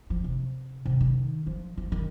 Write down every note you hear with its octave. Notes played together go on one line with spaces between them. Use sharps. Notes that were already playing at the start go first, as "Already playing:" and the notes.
F3
C3
C3
D#3
F3
F3
D#3